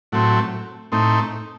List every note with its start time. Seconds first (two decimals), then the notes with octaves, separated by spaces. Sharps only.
0.12 A2 F#3 A3 C4
0.92 A2 A3 C4 D#4